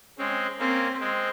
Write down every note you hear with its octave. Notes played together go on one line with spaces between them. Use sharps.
G#3 C4 C#4
A#3 C4 C#4
G#3 C4